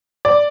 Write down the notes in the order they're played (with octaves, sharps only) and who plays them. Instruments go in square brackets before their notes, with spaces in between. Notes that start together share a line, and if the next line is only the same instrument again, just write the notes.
[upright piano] D5